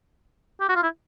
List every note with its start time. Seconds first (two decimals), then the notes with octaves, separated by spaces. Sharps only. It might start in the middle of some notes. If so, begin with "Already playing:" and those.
0.61 G4
0.69 F#4
0.75 F4
0.83 E4